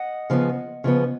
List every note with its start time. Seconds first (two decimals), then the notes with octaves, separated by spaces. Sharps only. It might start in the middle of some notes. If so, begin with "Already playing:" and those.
Already playing: D#5 F#5
0.30 C#3 F3 B3
0.84 C#3 F3 B3